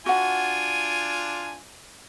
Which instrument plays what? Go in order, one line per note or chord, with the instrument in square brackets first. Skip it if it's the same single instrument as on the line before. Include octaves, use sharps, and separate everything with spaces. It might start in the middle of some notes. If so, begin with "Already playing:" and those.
[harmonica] D4 F4 G#5 [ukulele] F#4 F#5